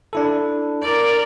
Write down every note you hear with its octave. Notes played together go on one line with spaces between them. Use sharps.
D4 E4 A4
A#4 D5